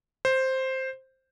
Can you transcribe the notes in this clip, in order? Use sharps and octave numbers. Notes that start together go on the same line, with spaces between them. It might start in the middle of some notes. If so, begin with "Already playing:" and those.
C5